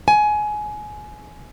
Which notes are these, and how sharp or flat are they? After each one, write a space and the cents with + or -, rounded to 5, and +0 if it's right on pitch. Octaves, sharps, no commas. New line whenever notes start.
G#5 +20